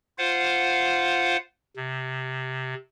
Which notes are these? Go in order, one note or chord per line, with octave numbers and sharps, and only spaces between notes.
F4 C5 F5 F#5
C3